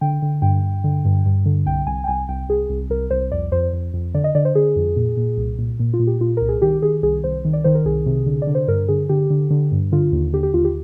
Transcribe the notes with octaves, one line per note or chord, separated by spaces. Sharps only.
D3 G5
D3
G2 G5
G2
D3
G2
G2
D3
C2 G5
C2 G#5
G5
C2 G#5
C2 G5
C2 G#4
C2
C2 A#4
C2 C5
F2 D5
F2 C5
F2
F2
D3 D5
D#5
D3 D5
C5
D3 G#4
F2
A#2
A#2
C2
A#2
A#2
F4
A#2
G4
A#2 F4
C2 A#4
G#4
D#3 G4
D#3 G#4
C2 G#4
C2 C5
D#3
D5
D#3 C5
A#4
C2 G#4
C3
D3
D5
D3
C5
G2 A#4
D3 G#4
D3 G4
D3
D3
G2
D3 F4
D#2
D3 G4
G4
D#2 F4
G4